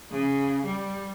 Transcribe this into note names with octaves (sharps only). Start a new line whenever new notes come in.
C#3
G3